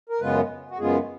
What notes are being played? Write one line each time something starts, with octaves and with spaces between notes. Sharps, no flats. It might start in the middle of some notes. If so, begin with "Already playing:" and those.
A#4
F#2 C#3 G#3 B3 F4 B4
F#4
F#2 C#3 G#3 B3 F4 G#4